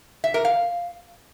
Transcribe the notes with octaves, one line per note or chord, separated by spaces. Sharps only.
E5
A#4
F5